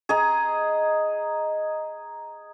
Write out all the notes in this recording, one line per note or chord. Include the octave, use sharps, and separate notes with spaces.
G#4 D#5 A#5